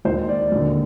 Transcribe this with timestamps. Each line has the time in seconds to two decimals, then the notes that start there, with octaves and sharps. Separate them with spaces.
0.05 D#2 D#3 G#3 C5
0.29 D5
0.52 D#2 D3 G#3